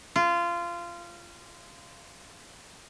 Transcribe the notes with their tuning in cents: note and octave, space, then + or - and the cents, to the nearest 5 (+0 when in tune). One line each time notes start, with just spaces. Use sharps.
F4 -20